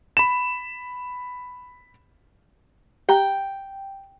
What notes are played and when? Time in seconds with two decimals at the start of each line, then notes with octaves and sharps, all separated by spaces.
0.17 B5 E7
3.09 G4 G5 A#5 F#6